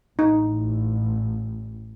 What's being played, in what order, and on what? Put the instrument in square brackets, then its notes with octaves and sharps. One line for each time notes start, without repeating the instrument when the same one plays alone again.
[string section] A1 [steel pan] D#4